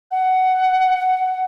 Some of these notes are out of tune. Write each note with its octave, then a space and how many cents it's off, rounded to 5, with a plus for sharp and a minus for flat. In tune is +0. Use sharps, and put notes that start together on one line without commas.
F#5 +10